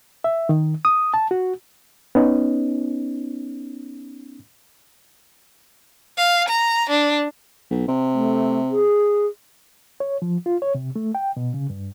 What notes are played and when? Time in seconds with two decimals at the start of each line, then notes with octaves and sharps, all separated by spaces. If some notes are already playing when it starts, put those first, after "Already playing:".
0.24 E5
0.49 D#3
0.85 D#6
1.14 A5
1.31 F#4
2.15 B3 C#4 D#4
6.18 F5
6.48 A#5
6.89 D4
7.71 B1
7.88 C3
8.12 A3
8.70 G#4
10.00 C#5
10.22 F3
10.46 F4
10.62 C#5
10.75 C3
10.96 A3
11.15 G5
11.37 B2
11.54 C#3
11.70 G2